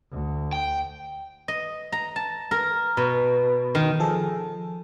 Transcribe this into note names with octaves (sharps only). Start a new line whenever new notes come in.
D2
G5
D#5
A#5
A5
A#4
B2
D#3
F3 G#4 A4